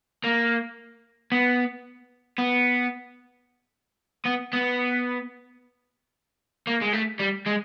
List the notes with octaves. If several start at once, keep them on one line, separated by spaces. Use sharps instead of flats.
A#3
B3
B3
B3
B3
A#3
G#3
A3
G3
G#3